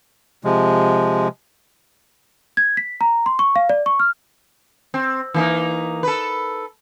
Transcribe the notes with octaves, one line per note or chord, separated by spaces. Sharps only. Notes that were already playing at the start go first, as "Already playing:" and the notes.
C3 F3 G#3
G#6
B6
A#5
C6
C#6
F5
D5
C#6
F6
C4
E3 A#3 D#4
A4 B4